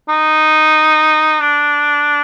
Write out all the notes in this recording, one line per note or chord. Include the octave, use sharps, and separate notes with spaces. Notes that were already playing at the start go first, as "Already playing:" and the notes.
D#4
D4